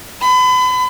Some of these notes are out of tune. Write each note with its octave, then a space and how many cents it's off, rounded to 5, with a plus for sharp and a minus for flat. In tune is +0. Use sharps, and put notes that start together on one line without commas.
B5 +35